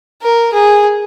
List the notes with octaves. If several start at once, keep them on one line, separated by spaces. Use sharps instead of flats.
A#4
G#4